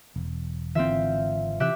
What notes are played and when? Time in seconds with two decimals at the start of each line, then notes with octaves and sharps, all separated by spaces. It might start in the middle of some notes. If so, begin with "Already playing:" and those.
0.16 E1
0.75 G#1 D3 E3 C4 F4 E5
1.60 C3 E3 G4 E5 F#6